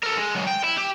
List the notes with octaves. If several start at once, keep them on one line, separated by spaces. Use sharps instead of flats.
A4 A#4
G#3
F#3 G#3
G5
E4
G4